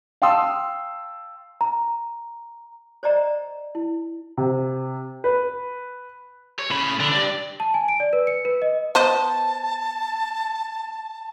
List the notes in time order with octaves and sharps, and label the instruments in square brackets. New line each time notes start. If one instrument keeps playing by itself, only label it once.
[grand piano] F5 G5 A5 C6 D#6 E6
[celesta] A#5
[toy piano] C5 D5 D#5 A#5
E4
[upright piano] C3
B4
[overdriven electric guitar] C#5
[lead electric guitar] A2 B5 [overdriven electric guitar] C#3
[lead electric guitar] D3 [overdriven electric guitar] D4
[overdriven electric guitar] G2 [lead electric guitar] D5
[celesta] A5
G#5
D7
D5
B4
C#7
B4
D#5
[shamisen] B3 C5 D#5 [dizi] A5